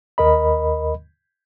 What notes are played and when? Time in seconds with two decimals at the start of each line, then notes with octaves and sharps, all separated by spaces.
0.18 D#2 A#4 D#5 B5